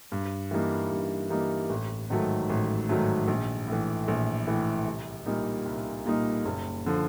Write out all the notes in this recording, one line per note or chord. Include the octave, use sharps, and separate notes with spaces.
G2
E3 G3 A#3 D#4
G2
E3 G3 A#3 D#4
A1
G#2 D#3 F#3 A3
A1
G#2 D#3 F#3 A3
A#1
A2 E3
A#1
A2 E3
C2
A#2 G3 A#3 D#4
C2
A#2 G3 A#3 D#4
F#1
D3 F3